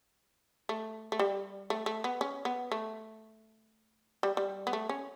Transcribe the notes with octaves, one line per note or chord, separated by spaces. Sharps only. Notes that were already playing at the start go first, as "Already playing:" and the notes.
A3
A3
G3
A3
A3
B3
C#4
B3
A3
G3
G3
B3
A3
C#4